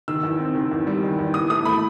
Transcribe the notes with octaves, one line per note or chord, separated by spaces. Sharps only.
D#3 E6
E2
C4
D#3
E2
G3
D#3
E2
E3 D#6
A3 D#6
A3 B5